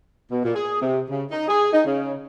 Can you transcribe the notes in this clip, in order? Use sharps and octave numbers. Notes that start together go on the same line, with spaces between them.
B2
A#2
G#4
C3
C#3
D#4
G#4
D#4
C#3